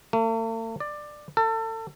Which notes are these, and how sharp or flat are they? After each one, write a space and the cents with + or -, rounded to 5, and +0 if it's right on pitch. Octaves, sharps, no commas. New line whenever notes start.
A3 +45
D5 +15
A4 +30